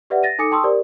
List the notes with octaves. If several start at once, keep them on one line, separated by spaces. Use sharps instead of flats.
G4 B4 D5 E5 F#5
A6 A#6 D#7
D#4 A4 G#5 D6 D#6 C#7
G5 A5 C6 C#6 D#6 E6
G4 A#4 C5 D5